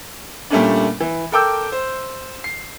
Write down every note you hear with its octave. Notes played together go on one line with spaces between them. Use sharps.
A#2 G3 A3 A#3 C#4 D4
E3
A4 A#4 G5 D6 E6 G6
C5
C7